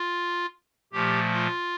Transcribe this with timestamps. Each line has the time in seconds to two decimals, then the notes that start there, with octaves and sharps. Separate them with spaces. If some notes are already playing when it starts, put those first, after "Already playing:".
Already playing: F4
0.92 A#2 F3 A3 G4
1.32 F4